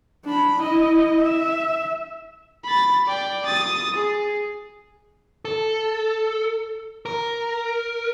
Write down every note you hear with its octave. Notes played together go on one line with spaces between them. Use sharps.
D4 B5
E4 D#5
E5
B5 A6
D5 G5
D#6 A6
G#4
A4
A#4